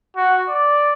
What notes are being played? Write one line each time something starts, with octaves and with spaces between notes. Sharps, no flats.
F#4
D5